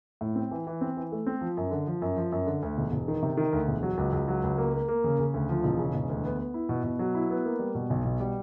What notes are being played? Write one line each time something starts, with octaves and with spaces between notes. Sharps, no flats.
A2
C4
E3
E3
C4
E3
A3
C4
F3
F#2
D3
F3
F#2
F3
F#2
D3
D2
E1
E1
D#3
C3
D#3
D2
E1
F#3
C#2
C#2
F#3
C#2
A#3
A#3
A#3
C#3
C#3
D2
F3
E1
C#3
E1
D2
B3
B3
E4
B2
B2
F#3
E4
B3
A#3
G3
B2
B1
B2
G3